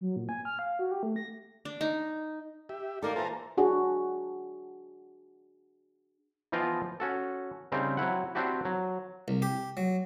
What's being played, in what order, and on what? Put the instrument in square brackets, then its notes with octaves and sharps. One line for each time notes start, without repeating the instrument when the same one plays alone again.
[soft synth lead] F#3
A#2
G#5
F6
F5
F#4
G4
A3
A#6
[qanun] D4
D#4
[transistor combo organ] G4 E5
[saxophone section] D#3 A#3 [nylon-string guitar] A4 A#4 [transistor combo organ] D5
[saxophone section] A#2 E3 [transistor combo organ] C5 A5 A#5
[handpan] D4 F#4 G#4
[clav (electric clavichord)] E3 F3 B3 F4 D#5 G5
C#4 F#4 A4
C#3 G3 C4 D#4
F#3 C4 E4 F#5
C4 D4 E4 F#4 G4
F#3
[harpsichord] C2
G4
F#3